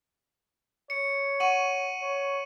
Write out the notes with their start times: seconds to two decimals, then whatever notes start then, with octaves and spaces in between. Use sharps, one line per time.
0.90 C#5 C#7
1.40 F#5 C#6 D#7 F#7
2.02 C#5